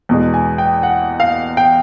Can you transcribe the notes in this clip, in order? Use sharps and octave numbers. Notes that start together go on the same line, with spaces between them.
E2 B2 G#3
G#5
G5
F#5
F5
G5